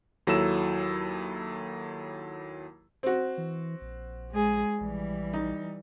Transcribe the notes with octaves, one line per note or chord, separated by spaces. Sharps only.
D#2 F#3 E4 A4 E6 E7
C4 F#4
E3
A#1
G#3 G#4
A#1 E3 G3
D#4